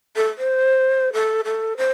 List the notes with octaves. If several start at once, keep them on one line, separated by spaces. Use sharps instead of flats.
A4
C5
A4
A4
C5